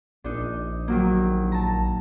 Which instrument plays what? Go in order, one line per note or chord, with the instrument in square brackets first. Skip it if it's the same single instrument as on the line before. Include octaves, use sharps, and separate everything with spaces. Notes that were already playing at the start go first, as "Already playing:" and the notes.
[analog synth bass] A#1 [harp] D4 D#4
[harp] D#3 F#3 A#3
A5 A#5